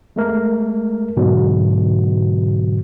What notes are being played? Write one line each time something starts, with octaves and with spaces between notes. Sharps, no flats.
G#3 A3 A#4
G#2 B2 D3 F#3